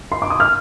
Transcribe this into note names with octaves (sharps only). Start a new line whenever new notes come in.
C6
D6
D#6
F6